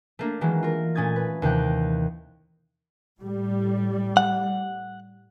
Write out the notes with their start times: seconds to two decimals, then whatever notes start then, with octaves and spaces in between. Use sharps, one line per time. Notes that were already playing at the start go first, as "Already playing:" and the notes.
0.19 A3 A#3 D4
0.41 D#3 E3 F#3 G#3 A#3
0.63 F4 A#4
0.95 A#2 A3 C#4 D#6 G#6 A6
1.16 B4
1.42 D#2 C3 E3 G5 F#6
3.18 A2 G3
4.17 F#5